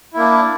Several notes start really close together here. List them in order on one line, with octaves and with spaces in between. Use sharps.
E4 A#3 D4